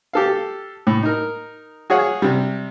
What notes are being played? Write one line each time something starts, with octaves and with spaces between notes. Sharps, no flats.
G4 A4 F5
A2
D#4 A#4
F#4 G#4 C#5 F5 F#5
C3 G3